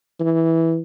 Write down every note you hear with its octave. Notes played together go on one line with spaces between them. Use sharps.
E3